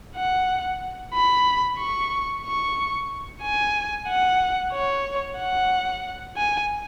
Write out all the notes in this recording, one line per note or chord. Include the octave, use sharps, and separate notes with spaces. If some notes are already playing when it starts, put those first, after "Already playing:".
F#5
B5
C#6
C#6
G#5
F#5
C#5
F#5
G#5